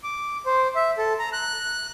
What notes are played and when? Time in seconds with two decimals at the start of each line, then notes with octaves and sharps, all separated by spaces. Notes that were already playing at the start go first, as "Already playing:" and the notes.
0.03 D6
0.46 C5
0.75 E5
0.98 A4
1.19 A#5
1.33 F#6